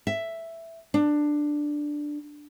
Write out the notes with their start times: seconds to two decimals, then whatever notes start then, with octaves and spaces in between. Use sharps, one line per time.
0.07 E5
0.94 D4